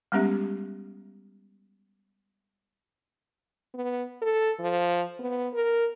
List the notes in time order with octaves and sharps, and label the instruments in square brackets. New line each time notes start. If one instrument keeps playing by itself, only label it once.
[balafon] G3 G#3 B3 C#4 G4 E5
[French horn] B3
A4
F3
B3
A#4